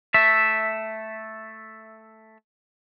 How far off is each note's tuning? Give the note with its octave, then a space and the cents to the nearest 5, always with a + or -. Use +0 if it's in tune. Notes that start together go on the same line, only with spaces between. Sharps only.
A3 +0 E5 +0